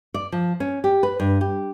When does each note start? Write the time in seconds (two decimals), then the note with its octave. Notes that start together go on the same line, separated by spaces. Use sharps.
0.14 D5
0.32 F3
0.60 C#4
0.84 G4
1.03 B4
1.20 G2
1.41 G4